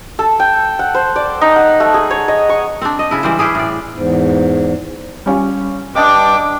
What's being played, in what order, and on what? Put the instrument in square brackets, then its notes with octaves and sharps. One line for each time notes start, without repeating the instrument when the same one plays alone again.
[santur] A4
G5
F#5
C5
D5
D#4
F#5
A3
G#4
C#5
D#5
C#6
[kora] C4 D4
D#5
C#3 E4
E3 G3 C5
C#4 E4 G4 G#4
A2 D5
[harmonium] E2 G#2
[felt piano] G3 C#4 F4
[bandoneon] G2 G5 D6 [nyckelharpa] D4 [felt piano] D#5 A5 D#6